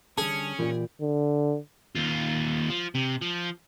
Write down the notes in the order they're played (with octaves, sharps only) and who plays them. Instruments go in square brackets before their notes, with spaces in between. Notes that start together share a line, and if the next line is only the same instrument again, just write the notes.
[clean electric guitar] D3 G3 A5 [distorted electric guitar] C#4 [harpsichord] G#4
[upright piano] A#2 [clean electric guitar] E3 G4 D5
[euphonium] D3
[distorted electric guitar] D#2 F4
F3
C3
F3